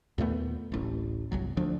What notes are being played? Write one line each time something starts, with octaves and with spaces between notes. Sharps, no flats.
D#2 A#2 A3 B3
D1 A1
G1 C2 F#3
D2 F3 D4